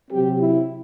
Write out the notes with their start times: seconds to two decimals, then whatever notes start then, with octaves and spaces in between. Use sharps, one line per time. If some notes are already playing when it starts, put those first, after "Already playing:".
0.11 C3 F#3 C4 G4
0.40 E4